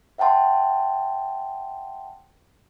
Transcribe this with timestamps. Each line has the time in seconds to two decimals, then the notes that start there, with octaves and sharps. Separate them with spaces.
0.18 E5 F#5 G5 A5 C6